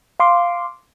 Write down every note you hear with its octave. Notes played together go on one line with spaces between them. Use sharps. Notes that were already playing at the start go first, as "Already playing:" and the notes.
F5 C6 D6